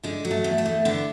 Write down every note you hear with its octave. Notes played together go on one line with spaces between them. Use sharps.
D3 G#3
F#3
A3
E2
A3
E2
D3 B3